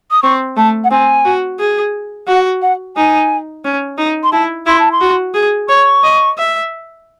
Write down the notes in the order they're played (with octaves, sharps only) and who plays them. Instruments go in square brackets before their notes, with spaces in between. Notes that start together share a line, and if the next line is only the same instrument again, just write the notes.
[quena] D#6
[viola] C4 [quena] C#6
[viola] A3 [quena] A5
[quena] F#5
[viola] C4 [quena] G#5
[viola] F#4
G#4
[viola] F#4 [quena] F#5
[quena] F#5
[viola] D#4 [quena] G#5
[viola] C#4
D#4
[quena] C6
[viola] E4 [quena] A5
[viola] E4 [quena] C6
[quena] A5
C6
[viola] F#4
G#4
[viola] C#5 [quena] C#6
[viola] D#5
E5